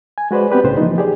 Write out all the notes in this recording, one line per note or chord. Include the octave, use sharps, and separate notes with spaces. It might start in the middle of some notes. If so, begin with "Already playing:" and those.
G#5
G#3 F#4 B4 C5 D5
B3 C4 G4 B4 D5
C2 A2 C#3 C5
E3 F3 A#3 D#4
G4 G#4 D5